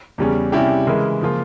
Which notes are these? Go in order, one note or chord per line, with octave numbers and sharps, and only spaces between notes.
E2 C#3 G3 C#4
C3 G3 C#4 E4 G4
C#3 E3 G#3 E4 A#4
C#3 F3 A#3 F4